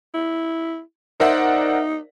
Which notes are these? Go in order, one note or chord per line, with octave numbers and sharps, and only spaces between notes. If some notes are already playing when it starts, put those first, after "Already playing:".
E4
D#4 A#4 C5 D5 E5 F#5